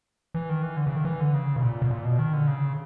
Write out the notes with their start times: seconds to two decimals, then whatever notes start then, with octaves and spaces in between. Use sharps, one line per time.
0.34 E3
0.49 D#3
0.62 E3
0.77 D3
0.87 C#3
0.96 D#3
1.05 E3
1.20 D3
1.34 C#3
1.56 B2
1.62 A#2
1.82 B2
1.91 A#2
2.05 B2
2.19 D#3
2.33 D3
2.47 C#3